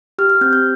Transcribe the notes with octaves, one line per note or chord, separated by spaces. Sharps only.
G4 F6
F6
C4 G6
G6